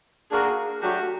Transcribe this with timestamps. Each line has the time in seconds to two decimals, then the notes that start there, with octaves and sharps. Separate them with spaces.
0.31 A#3 D4 F#4 G#4 A#4
0.82 F#3 A3 D4 F#4 G4